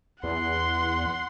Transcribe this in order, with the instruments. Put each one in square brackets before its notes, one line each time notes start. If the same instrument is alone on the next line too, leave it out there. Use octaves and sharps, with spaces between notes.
[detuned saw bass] E2 [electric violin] F#5 C6